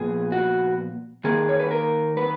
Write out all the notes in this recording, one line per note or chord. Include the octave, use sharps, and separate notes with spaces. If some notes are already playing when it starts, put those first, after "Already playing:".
Already playing: A#2 F3 B3 G#4
F#4
D#3 A#3 G#4
C#5
B4
A#4
B4